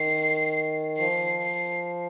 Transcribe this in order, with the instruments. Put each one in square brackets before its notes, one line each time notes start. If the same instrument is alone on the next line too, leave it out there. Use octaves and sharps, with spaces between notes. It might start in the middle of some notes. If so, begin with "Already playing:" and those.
Already playing: [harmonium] D#3 [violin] C7
[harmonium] F3 [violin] C7
[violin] C7